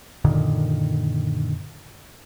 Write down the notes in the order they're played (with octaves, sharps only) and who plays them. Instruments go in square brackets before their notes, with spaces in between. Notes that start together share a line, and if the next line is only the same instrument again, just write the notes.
[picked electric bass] F#2 A#2 D3 D#3